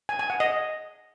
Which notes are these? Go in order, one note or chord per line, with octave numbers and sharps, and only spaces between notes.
G#5
G#5
F#5
D#5